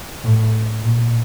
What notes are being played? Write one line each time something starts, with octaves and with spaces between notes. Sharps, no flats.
A2
A#2